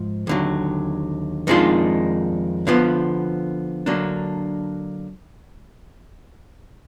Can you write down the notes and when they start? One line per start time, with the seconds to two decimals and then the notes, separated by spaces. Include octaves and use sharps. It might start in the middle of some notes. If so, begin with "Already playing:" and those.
Already playing: G#2 F3
0.27 D#2 D3 F#3
1.47 F2 D#3 G#3 D4 F4
2.67 D3 F3 B3 F4
3.86 D3 F#3 A#3 D4